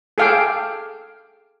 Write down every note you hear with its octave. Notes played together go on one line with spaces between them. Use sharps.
G#4 A4 F5 G5 D6